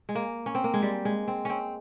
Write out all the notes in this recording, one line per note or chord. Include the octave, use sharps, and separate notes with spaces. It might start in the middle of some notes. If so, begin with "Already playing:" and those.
G#3
A#3
C#4
C4
A#3
G#3
G3
G#3
C4
C4 C#4